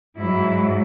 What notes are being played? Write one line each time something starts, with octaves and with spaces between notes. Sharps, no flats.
G#2 F#3 E4